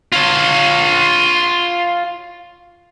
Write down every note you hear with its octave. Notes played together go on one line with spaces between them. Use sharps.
F4 C#5